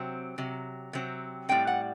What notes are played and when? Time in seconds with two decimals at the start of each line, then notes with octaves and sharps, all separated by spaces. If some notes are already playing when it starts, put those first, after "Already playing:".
Already playing: C3 F#3 C4
0.38 C3 F#3
0.93 C3 F#3 C4
1.49 A2 G3 C4 G5
1.67 F#5